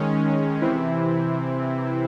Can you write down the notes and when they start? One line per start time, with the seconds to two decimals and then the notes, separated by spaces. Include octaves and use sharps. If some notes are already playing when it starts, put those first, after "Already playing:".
Already playing: D#3 G#3 C#4
0.61 C3 E3 C4 E4